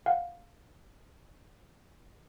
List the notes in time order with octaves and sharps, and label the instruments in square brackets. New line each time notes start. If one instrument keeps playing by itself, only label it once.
[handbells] F5 F#5